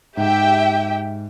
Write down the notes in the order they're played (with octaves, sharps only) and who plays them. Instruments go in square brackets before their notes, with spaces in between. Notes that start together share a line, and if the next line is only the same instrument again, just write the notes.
[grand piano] G#2 [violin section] G4 E5 G5